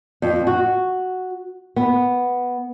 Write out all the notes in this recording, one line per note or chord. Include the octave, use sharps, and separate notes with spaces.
F2
F#4
B3